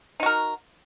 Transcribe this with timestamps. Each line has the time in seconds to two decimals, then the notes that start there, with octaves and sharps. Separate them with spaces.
0.20 D#4
0.23 F#4
0.26 A#4